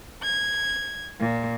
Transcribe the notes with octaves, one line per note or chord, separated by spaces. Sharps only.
G#6
A#2